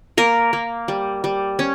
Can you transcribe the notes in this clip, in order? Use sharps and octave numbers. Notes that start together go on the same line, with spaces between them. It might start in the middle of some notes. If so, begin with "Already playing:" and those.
A#3 A#4
A#3
G3
G3
C#4